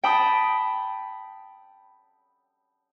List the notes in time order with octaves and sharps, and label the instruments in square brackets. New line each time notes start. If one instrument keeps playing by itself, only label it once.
[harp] G5 A5 B5 D#6